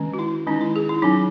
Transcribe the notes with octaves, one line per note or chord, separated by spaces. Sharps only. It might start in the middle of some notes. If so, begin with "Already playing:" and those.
Already playing: D#3 G#3 C#4
F#4
E4
D#3 G#3 C#4 D#4
E4
G#4
E4
F#3 C#4 D#4